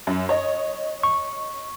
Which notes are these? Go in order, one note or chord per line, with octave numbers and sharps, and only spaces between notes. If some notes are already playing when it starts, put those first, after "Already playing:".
F#2
C#5 D#5
C#6